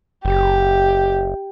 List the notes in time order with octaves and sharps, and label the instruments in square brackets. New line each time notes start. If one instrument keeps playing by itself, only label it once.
[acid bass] F#1 [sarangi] G4